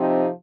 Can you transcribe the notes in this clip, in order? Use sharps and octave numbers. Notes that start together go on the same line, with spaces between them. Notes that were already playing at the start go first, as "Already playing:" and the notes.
Already playing: C3 F3 C4 D#4